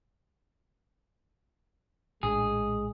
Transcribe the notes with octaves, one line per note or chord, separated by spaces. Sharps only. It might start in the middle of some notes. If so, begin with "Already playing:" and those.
A#1 A2 G#3 D4 G#4